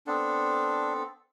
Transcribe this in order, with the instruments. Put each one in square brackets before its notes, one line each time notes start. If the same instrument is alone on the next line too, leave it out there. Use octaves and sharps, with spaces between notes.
[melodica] B3 C4 A4 [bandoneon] D4